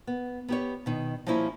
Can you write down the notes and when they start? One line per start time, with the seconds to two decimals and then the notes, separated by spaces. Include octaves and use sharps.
0.07 B3
0.48 B3 G4 C#5
0.86 B2 D#3
1.27 F3 G3 A#3 C#4 E4